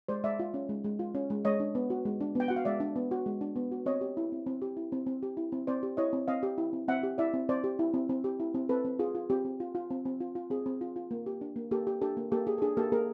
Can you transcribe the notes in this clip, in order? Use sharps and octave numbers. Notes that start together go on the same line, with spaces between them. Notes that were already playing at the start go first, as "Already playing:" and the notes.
G#3 C5 D5
G#3 D5 E5
F4
C#4
G#3
G#3
F4
C#4
G#3
G#3 C#5 D#5
D4
B3
F#4
G#3
D4
B3 G5
F#4 F#5
F5
G#3 D5 E5
D4
B3
F#4
G#3
D4
B3
F#4
C4 C#5 D#5
G4
E4
C4
C4
G4
E4
C4
C4
G4
E4
C4
C4 C5 D5
G4
E4 C#5 D#5
C4
C4 D#5 F5
G4
E4
C4
C4 E5 F#5
G4
E4 D5 E5
C4
C4 C5 D5
G4
E4
C4
C4
G4
E4
C4
C4 A4 B4
C4
F4 G#4
F4
C4 G4
C4
F4
F4
C4
C4
F4
F4
C4 G#4
C4
F4
F4
A#3
G4
D4
A#3
A#3 G4 A4
G4
D4 G4 A4
A#3
A#3 G4 A4
G4 G#4
A4
D4 G#4
A#3 G4 A4
A#3 G#4 A#4